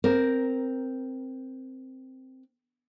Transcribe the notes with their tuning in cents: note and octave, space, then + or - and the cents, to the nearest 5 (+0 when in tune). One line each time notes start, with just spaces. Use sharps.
C4 +0 A#4 +0